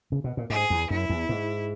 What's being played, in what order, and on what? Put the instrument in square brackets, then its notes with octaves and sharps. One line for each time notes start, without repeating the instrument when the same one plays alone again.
[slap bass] C#3
B2
A#2
[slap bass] G#2 [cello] G#4
[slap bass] E2
[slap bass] F#2 [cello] E4
[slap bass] E2
G#2